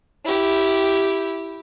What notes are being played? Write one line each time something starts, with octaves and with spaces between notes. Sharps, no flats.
E4 G4